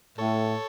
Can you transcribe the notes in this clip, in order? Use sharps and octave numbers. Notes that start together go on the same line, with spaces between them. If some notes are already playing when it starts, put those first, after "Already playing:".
A2 A4 C#5